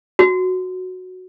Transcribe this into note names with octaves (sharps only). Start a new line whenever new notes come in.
F#4